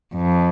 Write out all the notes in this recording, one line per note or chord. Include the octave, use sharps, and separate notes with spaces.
F2